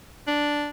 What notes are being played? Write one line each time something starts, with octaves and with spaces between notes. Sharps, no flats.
D4